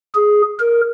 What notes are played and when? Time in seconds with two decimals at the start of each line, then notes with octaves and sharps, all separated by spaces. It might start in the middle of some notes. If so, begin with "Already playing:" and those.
0.15 G#4
0.59 A#4